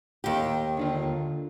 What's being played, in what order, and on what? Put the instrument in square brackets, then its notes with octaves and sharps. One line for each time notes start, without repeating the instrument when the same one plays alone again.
[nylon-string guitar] D#2 G4
[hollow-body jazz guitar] D3 D4 F4